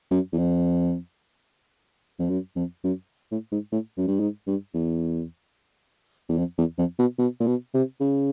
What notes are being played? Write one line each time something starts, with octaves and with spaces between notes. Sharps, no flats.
F#2
E2
F2
F2
F#2
F2
F#2
A2
G#2
A2
F#2
G2
G#2
G2
E2
E2
F2
E2
F2
B2
B2
A#2
B2
C3
C#3